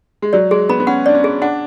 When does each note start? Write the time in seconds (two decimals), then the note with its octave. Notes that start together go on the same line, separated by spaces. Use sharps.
0.22 G#3
0.33 F#3 D5
0.51 G#3 G#4
0.69 B3 B5
0.80 B3
0.87 C#4 F#5
1.06 D4 D5
1.15 C#4
1.24 G#4
1.42 D4 F#5